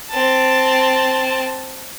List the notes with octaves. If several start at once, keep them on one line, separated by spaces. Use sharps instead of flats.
C4 A5